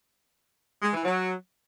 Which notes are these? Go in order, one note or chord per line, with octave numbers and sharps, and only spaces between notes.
G#3
E3
F#3